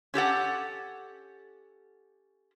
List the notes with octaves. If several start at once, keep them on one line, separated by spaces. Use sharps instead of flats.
C#4 G4 A4 F#5